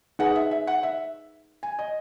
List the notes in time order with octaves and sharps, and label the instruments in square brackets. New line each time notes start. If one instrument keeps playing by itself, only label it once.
[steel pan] D#4 G#4 B4 [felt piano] F#5
[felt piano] E5
E5
F#5
E5
G#5
D#5